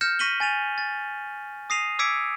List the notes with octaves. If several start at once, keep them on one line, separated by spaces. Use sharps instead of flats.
F6 G6 A#6 C#7 E7
C#6 A#6 B6 D#7 F#7 G7
G#5 A6 D#7 F7
A6
D#6 A#6 C7 D#7 F7
D6 E6 G#6 B6 C#7 D7